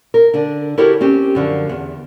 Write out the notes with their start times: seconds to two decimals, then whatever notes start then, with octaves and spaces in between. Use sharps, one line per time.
0.14 A#4
0.34 D3 D4
0.78 E4 F#4 G4 A4 A#4 C#5
1.01 C4 C#4 G4
1.35 F#2 D3 F3
1.69 E2